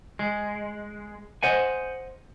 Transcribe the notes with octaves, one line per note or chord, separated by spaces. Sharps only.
G#3
C5 D#5 F#5 G#5